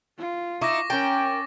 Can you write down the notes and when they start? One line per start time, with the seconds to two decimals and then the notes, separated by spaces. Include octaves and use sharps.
0.18 F4
0.62 D#4 E4 C#6 D6 A#6
0.90 C#4 A#4 G5 A6